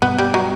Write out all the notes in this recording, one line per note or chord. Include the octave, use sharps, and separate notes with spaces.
G2 B2 B3
G3
F#3